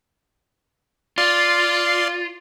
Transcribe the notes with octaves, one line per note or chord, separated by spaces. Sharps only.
F4 D5 F5 C6